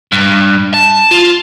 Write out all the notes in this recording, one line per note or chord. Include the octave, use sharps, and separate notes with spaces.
G2
A5
F4